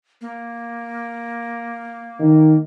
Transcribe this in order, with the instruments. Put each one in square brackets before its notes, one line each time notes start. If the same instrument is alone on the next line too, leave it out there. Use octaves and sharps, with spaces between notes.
[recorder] A#3
[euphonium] D#3